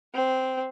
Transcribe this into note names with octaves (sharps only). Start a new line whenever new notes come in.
C4